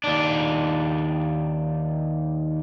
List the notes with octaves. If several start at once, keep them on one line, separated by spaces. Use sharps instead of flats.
D#2 D4